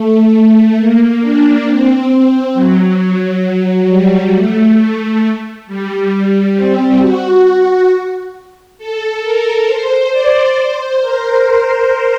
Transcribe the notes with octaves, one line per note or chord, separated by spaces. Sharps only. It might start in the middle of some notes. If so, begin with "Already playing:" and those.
Already playing: A3
A3
A#3
D4
C4
F#3
F#3
F#3
G3
A3
G3
C4
F#4
A4
A#4
C5
D5
C5
A#4